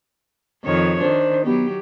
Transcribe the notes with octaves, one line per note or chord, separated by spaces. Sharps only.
F2 D#3 C#5
D#3 D4 C5
F#3 B3 G4